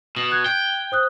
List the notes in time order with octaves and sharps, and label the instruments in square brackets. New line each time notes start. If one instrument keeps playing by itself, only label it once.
[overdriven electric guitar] B2 [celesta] F#7
[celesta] F#6 G#6
[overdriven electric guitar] G5
[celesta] C5 D#6 F#6